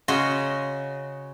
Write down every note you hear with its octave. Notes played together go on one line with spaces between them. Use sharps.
C#3 F#4 D#5 F#5 C6